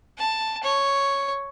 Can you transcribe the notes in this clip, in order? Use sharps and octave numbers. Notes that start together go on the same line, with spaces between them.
A5
C#5